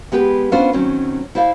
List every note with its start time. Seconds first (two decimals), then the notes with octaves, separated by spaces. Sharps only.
0.12 G#3 B3 G4 B4
0.52 B3 C#4 D4 F4 C5
0.73 D#3 F#3 C4 C#4
1.35 E4 C5 D5 F5